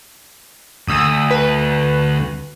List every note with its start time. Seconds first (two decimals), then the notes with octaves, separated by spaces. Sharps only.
0.88 D2 D#6 E6
1.31 B4